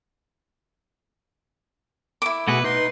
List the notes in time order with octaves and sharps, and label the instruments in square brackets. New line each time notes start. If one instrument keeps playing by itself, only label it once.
[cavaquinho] E4 D6
[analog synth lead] B2 [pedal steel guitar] A3 F#4 G#4 [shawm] B4
[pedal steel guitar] D#4 [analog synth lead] B4 [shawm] C6